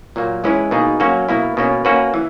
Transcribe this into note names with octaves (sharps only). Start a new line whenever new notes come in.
A#2 F#3 A#3
E3 G#3 C#4 E4 B4
B2 A#3 D#4 G#4
F#3 A#3 C#4 F#4
B2 A#3 E4
B2 A#3 C#4
A#3 C#4 F#4 B4
E3